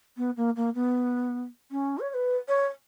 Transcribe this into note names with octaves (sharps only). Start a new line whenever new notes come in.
B3
A#3
A#3
B3
C#4
C#5
C#5
B4
C#5